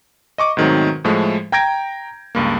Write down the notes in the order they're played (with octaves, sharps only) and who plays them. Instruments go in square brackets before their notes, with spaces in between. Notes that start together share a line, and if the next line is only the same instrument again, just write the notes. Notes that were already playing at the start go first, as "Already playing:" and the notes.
[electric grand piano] D#5 C#6 D6
G#2 B2 D#3 F#3 A3 C4
A2 F3 G#3 A3
G5 A#5 G6 G#6 A#6 D7
C#2 G2 A#3